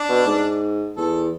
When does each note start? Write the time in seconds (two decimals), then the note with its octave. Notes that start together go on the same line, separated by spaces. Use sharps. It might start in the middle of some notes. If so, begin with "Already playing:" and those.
Already playing: D4
0.09 B2
0.26 G#2
0.97 E2 A4